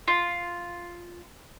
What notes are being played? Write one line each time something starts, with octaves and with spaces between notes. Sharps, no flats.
F4